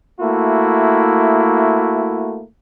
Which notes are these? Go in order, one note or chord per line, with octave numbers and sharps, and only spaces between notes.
A3 A#3 E4 F#4